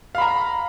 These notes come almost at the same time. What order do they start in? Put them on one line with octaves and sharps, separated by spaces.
F5 B5 A#5